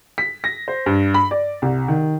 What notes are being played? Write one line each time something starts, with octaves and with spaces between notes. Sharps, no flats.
B6
A#6
C5
G2
B5
D5
C2
D#3